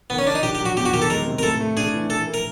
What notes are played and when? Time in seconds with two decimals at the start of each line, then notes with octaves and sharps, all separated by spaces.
0.10 D#3 B3
0.19 C#4
0.27 A#3 D4
0.35 D#4
0.43 D4 G4
0.55 G4
0.61 F#3 F#4
0.77 E2 G4
0.86 F#4
0.94 D#3 G4
1.02 A4
1.10 G#3 A#4
1.26 C3
1.39 A#4
1.43 A2 A4
1.60 A3
1.77 D4 G#4
1.94 E3
2.10 E3 A4
2.27 A#3
2.34 A#4